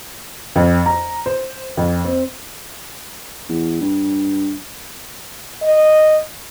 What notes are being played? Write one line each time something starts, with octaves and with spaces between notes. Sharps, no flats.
F2
A#5
C5
F2
C4
E2
G2
D#5